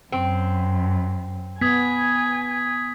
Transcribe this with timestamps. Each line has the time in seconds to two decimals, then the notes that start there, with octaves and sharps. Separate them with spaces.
0.12 F#2 C4
1.61 B3 G#5 D#6 G#6 B6